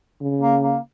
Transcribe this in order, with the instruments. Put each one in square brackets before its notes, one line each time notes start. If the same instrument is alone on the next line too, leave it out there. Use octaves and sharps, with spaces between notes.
[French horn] C#3
[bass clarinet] A#3
A#3